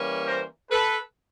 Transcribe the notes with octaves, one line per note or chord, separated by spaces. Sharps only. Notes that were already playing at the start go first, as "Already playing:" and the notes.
Already playing: E3 G3 A#3 C#4
A#4 C5
A4 B4